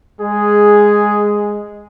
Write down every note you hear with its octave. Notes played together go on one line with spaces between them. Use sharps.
G#3 G#4